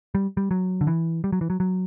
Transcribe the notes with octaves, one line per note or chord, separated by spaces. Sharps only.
G3
G3
F#3
D3
E3
G3
F#3
E3
F#3
F#3